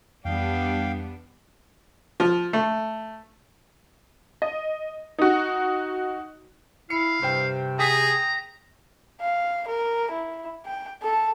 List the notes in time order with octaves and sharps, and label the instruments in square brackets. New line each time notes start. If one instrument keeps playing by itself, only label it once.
[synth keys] F2 E3 [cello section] G3 B3 D4 [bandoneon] F5 G5
[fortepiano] F3
A3
[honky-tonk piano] D#5
D#4 F#4
[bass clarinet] E4 [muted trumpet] F5 [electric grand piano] C#7
[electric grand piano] G2 C5 G5 [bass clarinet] C3
[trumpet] G#4 [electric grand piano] G5 D#6 B6 [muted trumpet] A#5
[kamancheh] F5
A#4
E4
G5
A4